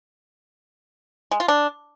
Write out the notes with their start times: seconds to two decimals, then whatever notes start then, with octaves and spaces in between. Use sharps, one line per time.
1.31 G#3
1.40 F4
1.48 D4